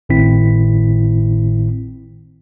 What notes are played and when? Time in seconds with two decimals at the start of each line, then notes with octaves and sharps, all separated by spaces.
0.09 G#1 A2 D#3 C4 E4 B6